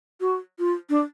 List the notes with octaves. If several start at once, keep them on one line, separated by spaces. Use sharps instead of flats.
F#4
F4
D4